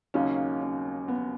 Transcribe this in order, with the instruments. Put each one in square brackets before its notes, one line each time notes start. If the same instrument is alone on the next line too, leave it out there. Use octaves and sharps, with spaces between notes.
[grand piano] D#2 C#3 F#3 A#3 D#4 [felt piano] C#4
[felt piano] C#4
B3